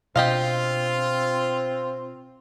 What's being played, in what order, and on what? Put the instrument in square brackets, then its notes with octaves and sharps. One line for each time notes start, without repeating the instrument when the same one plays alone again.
[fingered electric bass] B2 D4 [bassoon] C4 [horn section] F4 [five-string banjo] G4 D#5 F5